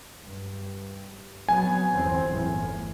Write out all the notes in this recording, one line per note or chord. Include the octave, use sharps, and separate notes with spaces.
G2
F#3 B3 G#5
G1 E2 C4
G1 E2 A2